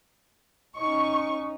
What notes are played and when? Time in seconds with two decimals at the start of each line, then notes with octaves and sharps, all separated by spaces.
0.79 C#4 D#4 C#6